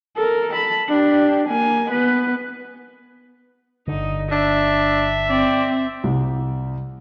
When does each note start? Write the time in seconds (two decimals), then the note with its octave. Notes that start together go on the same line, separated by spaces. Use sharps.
0.16 A4 A#4
0.54 A5 B5
0.89 D4 G4
1.48 A#3 G#5
1.91 B3 B4
3.88 G1 D3 D#4
4.32 D4 E5
5.30 C4 D5
6.04 C2